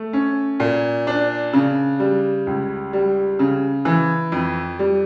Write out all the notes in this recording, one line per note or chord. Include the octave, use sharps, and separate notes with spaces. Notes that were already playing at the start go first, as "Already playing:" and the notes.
Already playing: A3
C#4
A#2
D4
C#3
G3
C#2
G3
C#3
E3
F2
G3